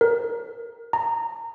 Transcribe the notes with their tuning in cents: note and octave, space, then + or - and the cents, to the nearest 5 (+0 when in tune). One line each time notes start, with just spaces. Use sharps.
A#4 +10
A#5 -20